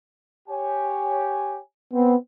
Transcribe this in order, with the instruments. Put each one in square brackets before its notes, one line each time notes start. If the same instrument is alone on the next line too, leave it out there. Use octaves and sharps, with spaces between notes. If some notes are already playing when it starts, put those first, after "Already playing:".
[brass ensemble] G4 C#5 G#5
[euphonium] B3 [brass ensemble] C4